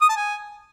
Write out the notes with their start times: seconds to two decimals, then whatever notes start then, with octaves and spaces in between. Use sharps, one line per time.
0.02 D#6
0.09 A5
0.17 G#5